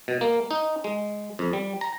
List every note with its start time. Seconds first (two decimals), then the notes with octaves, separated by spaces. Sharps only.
0.08 B2
0.21 A#3
0.51 D#4
0.84 G#3
1.39 F2
1.53 G3
1.81 A#5